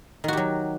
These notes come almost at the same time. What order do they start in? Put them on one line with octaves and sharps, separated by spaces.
D#3 F#4 G4 F#3